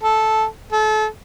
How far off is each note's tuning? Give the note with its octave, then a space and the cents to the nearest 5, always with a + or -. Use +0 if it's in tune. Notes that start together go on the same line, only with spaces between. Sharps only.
A4 -10
A4 -35